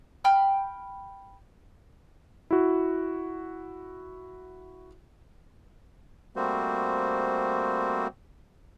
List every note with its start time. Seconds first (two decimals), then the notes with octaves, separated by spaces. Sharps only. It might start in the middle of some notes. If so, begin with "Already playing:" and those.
0.24 G5 B5 F6
2.51 E4 F#4
6.36 G3 A3 A#3 C4 F#4 C5